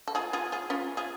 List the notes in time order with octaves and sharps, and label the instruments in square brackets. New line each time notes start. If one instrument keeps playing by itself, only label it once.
[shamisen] A4
F4 G#4
F4 G#4
F4 G#4
C#4 F4
F4 G#4